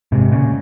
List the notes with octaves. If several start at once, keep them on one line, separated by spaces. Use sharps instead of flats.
G#2 C3
A#2 C#3